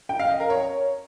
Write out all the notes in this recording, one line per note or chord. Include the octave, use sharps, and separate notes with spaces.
G5
F5
D#5
A#4
C#5